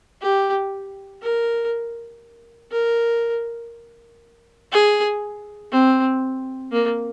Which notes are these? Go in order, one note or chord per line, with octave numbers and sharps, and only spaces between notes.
G4
A#4
A#4
G#4
C4
A#3